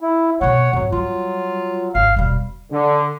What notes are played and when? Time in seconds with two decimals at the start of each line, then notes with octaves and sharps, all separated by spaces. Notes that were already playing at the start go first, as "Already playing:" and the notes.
0.01 E4
0.41 B2 B3 C#5 F#5
0.73 F2 G#2 F#3
0.92 G3 F4
1.95 G#1 F5
2.16 E1 B2 G3
2.71 D3